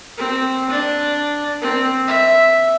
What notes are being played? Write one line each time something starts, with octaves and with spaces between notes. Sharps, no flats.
C4
D4
C4
E5